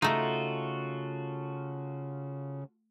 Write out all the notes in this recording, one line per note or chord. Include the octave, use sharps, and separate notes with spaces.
C#3 A3 D#4 F4 F#4 A4